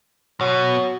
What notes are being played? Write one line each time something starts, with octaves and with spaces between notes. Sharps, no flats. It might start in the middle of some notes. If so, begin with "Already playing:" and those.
B2 F#3